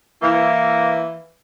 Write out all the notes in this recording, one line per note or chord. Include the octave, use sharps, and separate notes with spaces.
E3 A#3